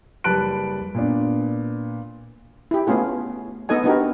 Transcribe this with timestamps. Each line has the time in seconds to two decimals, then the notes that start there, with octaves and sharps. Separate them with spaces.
0.24 F#1 G3 B4 A5 F#6 D7
0.95 A#2 B3 D4
2.71 E4 G4
2.87 A3 B3 C#4 F4 G#4
3.69 B3 D#4 A4 D#5 G#5
3.84 B3 D4 D#4 F#4 G4 A#4